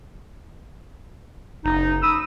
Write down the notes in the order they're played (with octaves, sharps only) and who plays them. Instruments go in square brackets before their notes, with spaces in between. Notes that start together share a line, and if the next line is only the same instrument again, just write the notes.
[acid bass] F#1 [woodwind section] D#4
[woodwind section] B5 D#6 E6